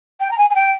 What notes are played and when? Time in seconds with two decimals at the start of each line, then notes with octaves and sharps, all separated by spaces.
0.20 G5
0.30 A#5
0.37 G#5
0.49 G#5
0.54 G5